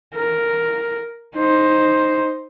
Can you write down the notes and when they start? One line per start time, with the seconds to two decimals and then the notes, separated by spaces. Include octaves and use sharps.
0.15 A#4
1.36 D#4 C5